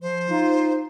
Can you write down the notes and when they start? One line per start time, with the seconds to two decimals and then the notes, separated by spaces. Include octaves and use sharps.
0.02 F3 C5
0.29 D#4 F4